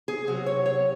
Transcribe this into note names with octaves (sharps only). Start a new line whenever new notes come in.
G#4
C3 F#3 F#4
C#5
C#5